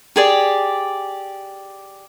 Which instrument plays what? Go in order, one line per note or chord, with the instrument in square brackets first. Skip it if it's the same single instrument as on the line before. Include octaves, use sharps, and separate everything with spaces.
[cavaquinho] G4 G#4 D5